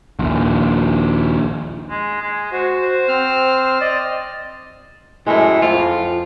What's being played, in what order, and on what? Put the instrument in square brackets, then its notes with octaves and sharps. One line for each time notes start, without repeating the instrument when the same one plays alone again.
[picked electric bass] A#1 D#2
[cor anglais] G#3
G#3
[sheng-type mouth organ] F#4 [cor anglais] C5
[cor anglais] C5
[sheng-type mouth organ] C4 F6
D5 D#5
[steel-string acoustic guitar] F#2 G#3 [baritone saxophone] A2
[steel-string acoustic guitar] F2 [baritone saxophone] F4